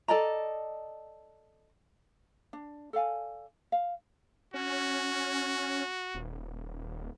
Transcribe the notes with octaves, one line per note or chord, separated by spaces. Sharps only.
A4 D5 D#5 A#5
D4
A4 D5 F5 G#5
F5
C#4 F#4
D#1